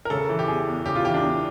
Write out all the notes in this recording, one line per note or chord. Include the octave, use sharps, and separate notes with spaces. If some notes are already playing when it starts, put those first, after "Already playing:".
A#4
C#3 A4
E3
G4
E2 G#4
E2
C#3 G4
F4
E3 G4
D4
E2